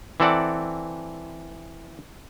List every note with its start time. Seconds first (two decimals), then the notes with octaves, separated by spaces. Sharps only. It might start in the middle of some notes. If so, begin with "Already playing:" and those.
0.20 E3 C4 A4 D5 F#5